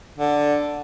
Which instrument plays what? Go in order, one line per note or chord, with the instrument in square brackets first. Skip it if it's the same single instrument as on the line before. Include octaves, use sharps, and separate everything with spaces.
[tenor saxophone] D3